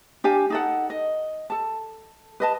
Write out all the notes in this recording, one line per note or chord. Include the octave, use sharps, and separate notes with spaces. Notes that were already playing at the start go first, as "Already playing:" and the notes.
D4 G4 F5 G#5
D#4 A4 F#5
D#5
A4 A5
B4 D#5 A5